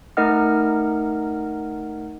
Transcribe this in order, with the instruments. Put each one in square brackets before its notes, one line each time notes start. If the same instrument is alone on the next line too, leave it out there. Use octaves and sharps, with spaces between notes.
[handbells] A3 D#4 A#4 D#5 F#5 F6